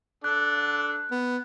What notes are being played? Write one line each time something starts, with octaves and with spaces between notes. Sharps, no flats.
D4 A4 F#6
B3